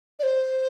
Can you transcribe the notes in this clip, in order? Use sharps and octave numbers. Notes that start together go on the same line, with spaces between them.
D5
C5